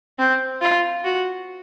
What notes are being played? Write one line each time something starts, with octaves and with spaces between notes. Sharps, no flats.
C4
F4
F#4